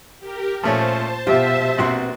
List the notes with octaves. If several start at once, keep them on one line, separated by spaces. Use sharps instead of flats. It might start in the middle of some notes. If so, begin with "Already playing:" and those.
G4 A#4
A#2 F3 A3 C#4 C5 A5
B2 F4 G4 E5
A#1 B3 C4 F#4 F#5 C6